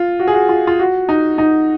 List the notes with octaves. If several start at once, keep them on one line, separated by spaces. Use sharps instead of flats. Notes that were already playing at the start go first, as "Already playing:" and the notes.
Already playing: F4
F#4
G#4
F#4
F4
F4
F#4
D#4
D#4